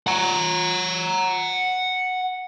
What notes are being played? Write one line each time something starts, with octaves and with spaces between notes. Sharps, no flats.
F#5 A#5